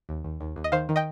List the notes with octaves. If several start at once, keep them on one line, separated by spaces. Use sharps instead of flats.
D#2
D#2
D#2
D#2
D#5
D#3 C5 F5
D#3
D#5 G5